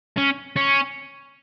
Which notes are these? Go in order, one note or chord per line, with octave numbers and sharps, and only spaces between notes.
C#4
C#4